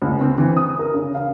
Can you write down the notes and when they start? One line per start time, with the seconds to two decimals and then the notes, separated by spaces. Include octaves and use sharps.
0.02 C#2
0.21 C4
0.38 E3
0.56 D#6
0.79 A#4
0.94 C#3
1.15 F5